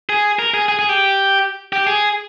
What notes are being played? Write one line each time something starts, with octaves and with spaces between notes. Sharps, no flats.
G#4
A#4
G#4
G#4
G#4
G4
G4
G#4